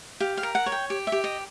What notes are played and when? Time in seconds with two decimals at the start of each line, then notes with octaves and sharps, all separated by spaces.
0.20 G4 F5
0.37 F5
0.43 A#4
0.55 F#5
0.66 C#5
0.72 G5
0.90 G4
1.07 E5
1.12 G4
1.24 D#5